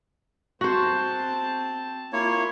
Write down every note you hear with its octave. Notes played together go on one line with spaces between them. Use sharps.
C4 F#4 C5 A5
A#3 E4 F4 C#5